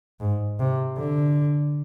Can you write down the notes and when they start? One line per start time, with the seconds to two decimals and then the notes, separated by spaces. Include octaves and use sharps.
0.20 G#2
0.59 C3
0.98 D3